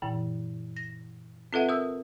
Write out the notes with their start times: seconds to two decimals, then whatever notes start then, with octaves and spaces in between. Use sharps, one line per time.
0.02 F#2 A#2 E3
0.76 A#6
1.53 C4 F4 A4 B4 E5 F#5
1.69 A#4 E5 D#6 E6